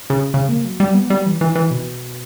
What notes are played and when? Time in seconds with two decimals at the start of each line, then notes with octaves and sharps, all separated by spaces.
0.10 C#3
0.34 C#3
0.49 A#3
0.65 F#3
0.80 G3
0.94 B3
1.10 G3
1.26 E3
1.41 E3
1.56 E3
1.71 B2